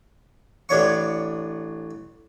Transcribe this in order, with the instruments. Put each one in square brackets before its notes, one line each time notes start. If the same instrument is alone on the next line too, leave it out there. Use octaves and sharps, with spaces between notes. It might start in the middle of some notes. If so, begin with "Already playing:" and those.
[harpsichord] A1 D4 C#5 C#6